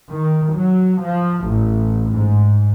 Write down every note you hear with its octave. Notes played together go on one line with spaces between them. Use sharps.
D#3
F#3
F3
A1
G#2